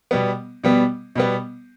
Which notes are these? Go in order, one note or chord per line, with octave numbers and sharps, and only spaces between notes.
B2 G3 B3
B2 G3 B3
B2 G3 B3